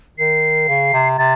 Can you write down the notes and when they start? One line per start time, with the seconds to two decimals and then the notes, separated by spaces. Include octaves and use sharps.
0.18 D#3 C7
0.68 C#3
0.93 C3
1.18 C3 A6